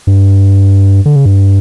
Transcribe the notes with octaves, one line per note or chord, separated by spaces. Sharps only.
G2
D3
C#3
G2